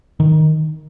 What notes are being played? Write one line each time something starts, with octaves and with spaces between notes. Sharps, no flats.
D#3